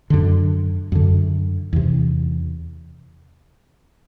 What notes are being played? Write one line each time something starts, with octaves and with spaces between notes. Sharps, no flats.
F#2 D3
F#2 D3
E2 C3